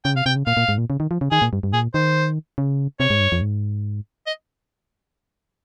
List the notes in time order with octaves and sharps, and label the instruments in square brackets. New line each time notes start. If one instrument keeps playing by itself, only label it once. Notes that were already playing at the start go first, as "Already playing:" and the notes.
[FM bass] C#3 [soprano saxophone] G5
[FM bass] C3 [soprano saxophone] F5
[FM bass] C3 [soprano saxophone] G5
[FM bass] C#3
[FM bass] A#2 [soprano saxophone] F5
[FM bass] A#2
G#2
A#2
C#3
D#3
F3
C#3
[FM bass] D#3 [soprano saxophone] G#4
[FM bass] A#2
G2
G2
[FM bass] A#2 [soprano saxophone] G#4
[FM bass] D#3 [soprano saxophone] C5
[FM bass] C#3
[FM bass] C3 [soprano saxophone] C#5
[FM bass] G#2
G2
F2
G#2
[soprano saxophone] D#5